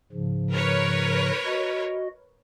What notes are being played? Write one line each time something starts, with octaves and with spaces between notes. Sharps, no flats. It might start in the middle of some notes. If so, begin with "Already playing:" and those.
G#2 C#3 F3
A#4 B4 C#5
F#4 D#5